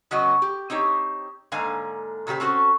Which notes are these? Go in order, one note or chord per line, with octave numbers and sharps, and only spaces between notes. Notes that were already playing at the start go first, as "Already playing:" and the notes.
C#3 F#3 B3 C#4 F#4 D#5
G4
C4 D#4 G4 C#5
G#2 D3 A#3 F5 G#5
A#2 C#3 F4 G4 C5
C4 C#4 F#4 A4